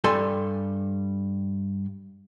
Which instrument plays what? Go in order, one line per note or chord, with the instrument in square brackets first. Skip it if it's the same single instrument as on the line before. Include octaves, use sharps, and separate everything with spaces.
[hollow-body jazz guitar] G2 G3 A4 G#5 C6